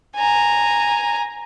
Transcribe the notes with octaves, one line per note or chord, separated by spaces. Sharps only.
G#5 A#5